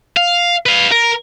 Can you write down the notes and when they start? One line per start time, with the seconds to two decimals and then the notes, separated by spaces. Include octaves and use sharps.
0.17 F5
0.66 B4 F5
0.91 A#4